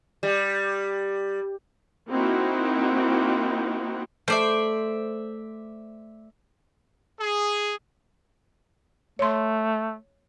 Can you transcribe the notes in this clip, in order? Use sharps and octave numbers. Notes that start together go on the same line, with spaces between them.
G3
A#3 C4 D#4 E4 F#4
A3 C5 D5 E5
G#4
A3 C#5 C6